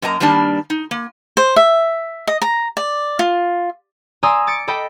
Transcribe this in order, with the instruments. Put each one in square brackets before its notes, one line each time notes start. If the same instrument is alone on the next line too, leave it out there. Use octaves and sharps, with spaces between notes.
[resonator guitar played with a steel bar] F#2 A#3 D#5 G#5 A#5
G2 D#3 G3 A#3 D4 A5
D#4
A#3
[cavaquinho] C5
E5
D#5
A#5
D5
F4
[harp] D5 G#5 A#5 C6 D#6 E6
D6 A6 C#7 D7
A4 D#5 G5 B5